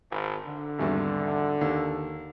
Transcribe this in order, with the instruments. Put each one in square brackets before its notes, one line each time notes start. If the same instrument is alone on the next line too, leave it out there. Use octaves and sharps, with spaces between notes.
[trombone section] G#1
D3
[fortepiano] G#1 E2 G2
D#2